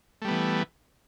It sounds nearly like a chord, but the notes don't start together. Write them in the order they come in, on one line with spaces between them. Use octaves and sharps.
A3 G3 B3 E3